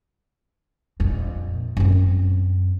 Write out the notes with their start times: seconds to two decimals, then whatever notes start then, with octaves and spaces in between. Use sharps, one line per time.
1.00 A#1 F2
1.77 F#2 C4